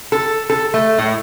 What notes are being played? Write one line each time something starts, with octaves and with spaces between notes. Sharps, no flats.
A4
A4
A3
A2